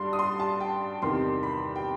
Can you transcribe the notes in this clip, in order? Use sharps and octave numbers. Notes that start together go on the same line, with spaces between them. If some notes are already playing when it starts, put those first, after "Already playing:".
Already playing: G2 G3 C6
D#6
C6
A5
G5
E2 C3 D#3 C6
B5
G5